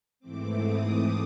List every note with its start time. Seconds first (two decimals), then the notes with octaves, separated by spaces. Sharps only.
0.20 G#2 E3 A3 C4 D6
0.58 D#6
0.95 D6